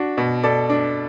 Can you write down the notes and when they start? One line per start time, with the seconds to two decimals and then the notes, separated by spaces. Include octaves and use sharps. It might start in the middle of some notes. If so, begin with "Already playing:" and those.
Already playing: D4 F#4
0.18 B2
0.43 B2 A4 D5
0.70 D4